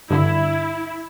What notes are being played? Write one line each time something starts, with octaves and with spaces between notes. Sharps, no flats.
G2 D3 E4